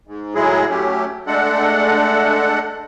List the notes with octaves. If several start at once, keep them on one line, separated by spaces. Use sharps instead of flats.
G#2
A2 F#3 G#3 E4 G#4
F#3 A3 C#4 G4
G#3 A3 D4 A4 F#5